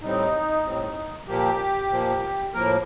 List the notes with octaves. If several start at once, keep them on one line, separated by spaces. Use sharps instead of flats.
A2 G3 C4 D#4
A2 G3 C4
A#2 F3 A#3 G4
A#2 F3 A#3
A2 F3 A#3 A#4